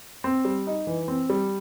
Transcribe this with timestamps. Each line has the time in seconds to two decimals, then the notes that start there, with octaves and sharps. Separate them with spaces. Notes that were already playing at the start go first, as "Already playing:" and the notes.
0.24 C4
0.45 G3
0.67 D#4
0.87 E3
1.08 C4
1.30 G3